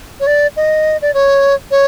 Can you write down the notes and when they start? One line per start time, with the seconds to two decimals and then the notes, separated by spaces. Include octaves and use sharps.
0.20 C#5
0.27 D5
0.57 D#5
1.02 D5
1.14 C#5
1.71 C#5